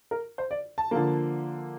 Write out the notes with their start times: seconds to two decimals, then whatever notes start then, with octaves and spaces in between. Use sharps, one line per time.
0.11 A#4
0.38 C5
0.51 D5
0.78 A5
0.91 D3 F3 A#3